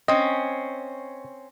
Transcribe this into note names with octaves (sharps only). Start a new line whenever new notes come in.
C4 C#4 D#5